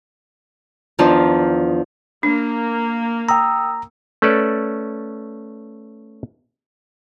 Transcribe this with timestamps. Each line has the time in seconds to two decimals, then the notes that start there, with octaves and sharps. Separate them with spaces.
0.99 E2 D#3 F3 D4 F4 A5
2.23 A#3 D4
3.29 G5 A#5 D#6 E6
4.22 A3 C#4 A4 B4 D5